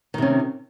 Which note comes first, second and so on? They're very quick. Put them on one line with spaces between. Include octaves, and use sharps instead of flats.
D#3 C3 C#4